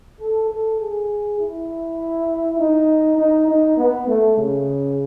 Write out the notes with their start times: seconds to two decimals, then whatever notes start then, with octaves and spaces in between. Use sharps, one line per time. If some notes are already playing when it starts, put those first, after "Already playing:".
0.21 A4
0.51 A4
0.81 G#4
1.40 E4
2.59 D#4
3.18 D#4
3.48 D#4
3.78 B3
4.08 A3
4.37 C#3